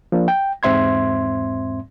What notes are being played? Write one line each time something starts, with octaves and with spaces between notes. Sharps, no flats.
F3 A#3 D4
G5
E2 G#2 C4 E5 C6 G#6